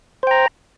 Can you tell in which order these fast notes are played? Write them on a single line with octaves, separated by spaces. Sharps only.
C5 G5 A#5